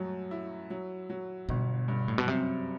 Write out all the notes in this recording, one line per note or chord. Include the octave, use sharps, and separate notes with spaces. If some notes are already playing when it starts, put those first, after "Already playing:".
Already playing: F#2 F#3 G3 A3
E4
F#3
F#3
G1 B2
G2
A2
B2
F#2 C3